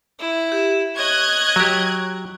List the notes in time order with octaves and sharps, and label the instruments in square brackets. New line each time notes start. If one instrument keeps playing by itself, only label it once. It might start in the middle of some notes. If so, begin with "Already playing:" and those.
[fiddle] E4
[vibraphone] G4
[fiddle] C#5 D#5 [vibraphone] C#6 [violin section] F#6 G#6
[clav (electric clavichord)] F#3 G4